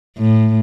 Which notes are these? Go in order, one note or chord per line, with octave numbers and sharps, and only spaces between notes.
A2